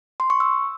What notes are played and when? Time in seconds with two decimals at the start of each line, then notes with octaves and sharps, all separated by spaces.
0.20 C6
0.30 C#6
0.40 E6